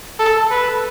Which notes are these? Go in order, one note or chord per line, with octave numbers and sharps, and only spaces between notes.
A4
B4